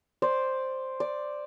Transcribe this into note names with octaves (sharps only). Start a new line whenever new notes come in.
C5 D5
D5